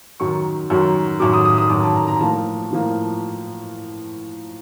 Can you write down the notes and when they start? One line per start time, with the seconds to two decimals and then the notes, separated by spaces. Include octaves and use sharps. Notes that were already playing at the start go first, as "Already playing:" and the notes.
0.20 F#2 D#3 F#3 C#6
0.70 F#2 D#3 F#3
1.20 F#2 D#3 F#3 D6
1.33 D#6
1.45 D#6
1.58 D#6
1.70 F#2 D#3 F#3 D6
1.83 A5
1.96 A#5
2.07 A#5
2.21 A2 F3 A#3 A5
2.71 A2 F3 A#3